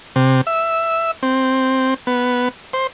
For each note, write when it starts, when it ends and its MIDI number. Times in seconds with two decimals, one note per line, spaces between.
0.16 0.41 48
0.47 1.11 76
1.23 1.94 60
2.07 2.49 59
2.73 2.87 72